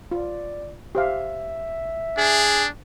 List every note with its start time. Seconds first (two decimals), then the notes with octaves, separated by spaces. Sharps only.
0.11 F4 D5
0.95 G4 C5 E5 F5
2.18 D4 G#4